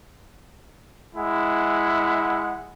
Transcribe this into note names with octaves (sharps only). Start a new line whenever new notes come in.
G#3 E4 F#5